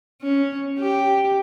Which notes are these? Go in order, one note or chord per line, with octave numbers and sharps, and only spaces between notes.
C#4
G4